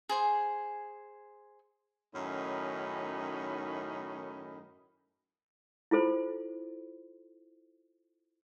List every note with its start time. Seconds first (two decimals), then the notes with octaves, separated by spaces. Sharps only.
0.09 G#4 C5 G#5
2.14 F#2 A2 D#3 C#4 D#4 B5
5.91 E4 F4 A4 C5